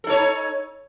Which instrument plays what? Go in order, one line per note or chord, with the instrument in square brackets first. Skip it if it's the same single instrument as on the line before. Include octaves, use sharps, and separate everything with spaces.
[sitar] A4
D#4
C#5